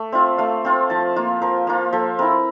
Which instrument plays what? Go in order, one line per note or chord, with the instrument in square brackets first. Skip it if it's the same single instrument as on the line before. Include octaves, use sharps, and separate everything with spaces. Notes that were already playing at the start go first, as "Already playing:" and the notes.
Already playing: [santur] A3
C4 F4 E5
A3 F5
C4 F4
F3 A5
A#3 F4
F3 A#4
A#3 F4
F3 A4
C4 E4 A#4